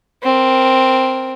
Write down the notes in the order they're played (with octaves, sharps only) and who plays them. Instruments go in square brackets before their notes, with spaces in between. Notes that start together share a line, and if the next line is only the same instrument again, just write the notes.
[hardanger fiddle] C4 A#4